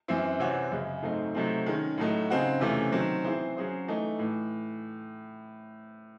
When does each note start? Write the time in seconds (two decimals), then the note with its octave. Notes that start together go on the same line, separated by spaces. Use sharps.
0.08 F#2 E3 C4 E4
0.39 C3 E3 C4 F#4 C#5
0.72 F#2 C#3 G#3
1.02 G#2 F#3 A3 C4 D#4
1.35 C3 F#3 A3 C4 D#4
1.66 D#3 G#3 C#4
1.98 A2 F#3 A3 D#4
2.30 C#3 G#3 C4 D#4 F#4
2.61 E2 C3 E3 A3 C#4
2.92 D#3 F#3 C4
3.24 E3 C4 E4 G#4 C5
3.57 F#3 C#4 G#4 C5
3.87 E3 A3 D#4
4.19 A2 E3